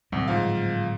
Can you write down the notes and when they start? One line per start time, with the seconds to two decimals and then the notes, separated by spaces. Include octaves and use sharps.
0.12 D1 C2 F#3 G3
0.28 G#2 F3 F5